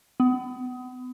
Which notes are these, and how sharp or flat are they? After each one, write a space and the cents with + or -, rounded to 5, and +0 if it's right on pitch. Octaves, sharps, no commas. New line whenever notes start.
B3 +35